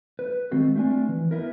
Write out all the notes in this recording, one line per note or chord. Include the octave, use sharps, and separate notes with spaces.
B4
D#3 G#3 C4 F4 F#4 A4
A3 C4 D4 F4 G#5
E3
B3 E4 A#4